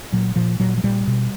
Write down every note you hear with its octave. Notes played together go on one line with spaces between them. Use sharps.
A#2 F#3
A#2 F3
A#2 F#3
F#3
A#2 G3
B2